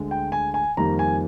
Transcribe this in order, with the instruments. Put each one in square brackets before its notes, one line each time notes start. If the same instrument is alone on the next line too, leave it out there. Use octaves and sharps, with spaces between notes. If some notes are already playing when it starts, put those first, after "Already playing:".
Already playing: [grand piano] D2 D3 G#3
G5
G#5
G#5
F2 D#3 G3 A#3 A#5
G#5